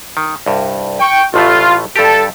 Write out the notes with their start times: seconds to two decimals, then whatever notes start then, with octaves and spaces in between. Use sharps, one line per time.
0.17 D#3
0.46 C2 G2
0.99 G5 C#6
1.34 A1 A2 A3 F4
1.96 G2 G4 A4